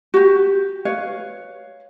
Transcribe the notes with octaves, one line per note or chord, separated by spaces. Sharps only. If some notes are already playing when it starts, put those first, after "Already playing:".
F#4 G4
B4 C#5 F5